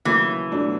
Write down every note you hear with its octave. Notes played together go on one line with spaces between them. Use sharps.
D#2 C#3 E3 F#3 A#3
E2 B2 F#3 A3 D4